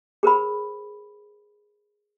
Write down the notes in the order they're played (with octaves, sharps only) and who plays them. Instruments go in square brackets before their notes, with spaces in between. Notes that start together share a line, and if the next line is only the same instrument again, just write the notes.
[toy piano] G#4 A#4 C5 B5